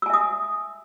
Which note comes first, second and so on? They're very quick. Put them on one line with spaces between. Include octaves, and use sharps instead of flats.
E6 G#5 E5 D#6